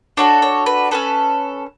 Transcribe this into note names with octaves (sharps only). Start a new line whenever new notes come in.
D4 F#4 A4 C#5
C#5
B4
C#4 F#4 A4 B4